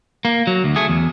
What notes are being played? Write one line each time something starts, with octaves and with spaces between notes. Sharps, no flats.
A#3
F#3
D2
A3 G#4
E2